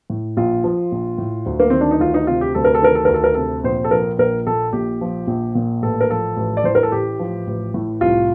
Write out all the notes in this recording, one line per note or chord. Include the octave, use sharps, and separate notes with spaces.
A2
A#1 F4
F3
A#1
A2
D2
A#3
D#3 C4
D4
D#4
D2 F4
D#4
C3 F4
G4
D2 A4
A#4
A4
D#3 A#4
A4
D2 A#4
A4
A#4
C3 A4
A#1 C5
A4
F3 A#4
A#1 A#4
A#2 A4
A#1 G4
F3
A#1
A#2
A1 A4
A#4
F3 A4
A1
D5
A2 C5
A#4
A4
A1 G4
F3
A1
A2
C2 F4